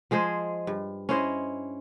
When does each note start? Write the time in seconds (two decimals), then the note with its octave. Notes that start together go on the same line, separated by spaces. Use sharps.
0.11 F3 G#3 G#4 C5
0.67 G2
1.09 C#4 E4 C5 D#5